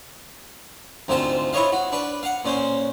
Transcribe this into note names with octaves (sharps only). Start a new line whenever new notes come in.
D2 G#2 C3 F4 A5
E4 F4 C#5 D#5 F5
F#4
D4 B4
F5 F#5
A#2 C#4 C5